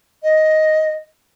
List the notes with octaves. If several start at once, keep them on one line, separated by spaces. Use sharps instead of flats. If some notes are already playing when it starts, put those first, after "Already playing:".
D#5